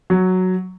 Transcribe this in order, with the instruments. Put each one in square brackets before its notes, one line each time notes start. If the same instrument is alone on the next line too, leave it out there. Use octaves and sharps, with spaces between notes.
[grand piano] F#3